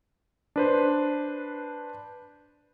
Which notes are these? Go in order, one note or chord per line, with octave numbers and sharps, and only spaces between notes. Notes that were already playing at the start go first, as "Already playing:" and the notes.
D4 B4 C5